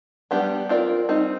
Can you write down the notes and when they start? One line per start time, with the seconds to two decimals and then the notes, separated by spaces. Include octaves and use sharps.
0.31 G3 B3 D4 G4
0.69 C4 F4 A#4 D5
1.09 G3 C4 D#4